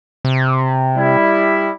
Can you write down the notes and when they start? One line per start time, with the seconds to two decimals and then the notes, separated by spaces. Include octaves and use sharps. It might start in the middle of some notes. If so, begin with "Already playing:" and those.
0.25 C3
0.96 G3 E4